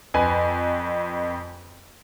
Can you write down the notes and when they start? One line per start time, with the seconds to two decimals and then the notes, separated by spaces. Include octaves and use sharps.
0.14 F2 B4 G#5